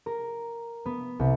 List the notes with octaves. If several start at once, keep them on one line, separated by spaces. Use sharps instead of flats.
A#4
B3
C2